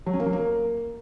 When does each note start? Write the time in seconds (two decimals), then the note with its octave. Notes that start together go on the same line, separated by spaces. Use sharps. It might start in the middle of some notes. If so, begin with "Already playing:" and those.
0.06 F#3
0.13 C#4
0.20 A#3
0.26 F#3
0.33 A#3